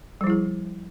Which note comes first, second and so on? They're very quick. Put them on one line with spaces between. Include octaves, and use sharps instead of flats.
G3 F3 E4 G#4